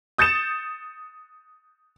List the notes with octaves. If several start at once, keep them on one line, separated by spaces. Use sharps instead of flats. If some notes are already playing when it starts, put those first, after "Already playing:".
D#6 G6 A6 C#7 E7